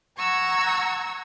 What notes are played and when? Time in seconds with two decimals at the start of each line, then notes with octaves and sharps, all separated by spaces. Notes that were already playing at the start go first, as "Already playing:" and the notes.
0.17 F#5 A#5 C#6 E6 G#6